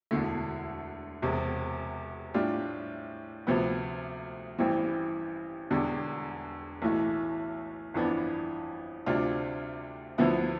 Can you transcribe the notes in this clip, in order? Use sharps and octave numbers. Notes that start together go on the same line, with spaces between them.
E1 D2 D3 A3 E4
E1 E2 C3
A2 G3 D4 F4
D2 C3 F3 B3
A1 G2 E3 G3 C4
E1 E2 D3 G3 D4
B1 A2 E3 A3
G1 F2 E3 B3 D4
D2 C3 G3 D4 F4
D2 D3 F3 B3 E4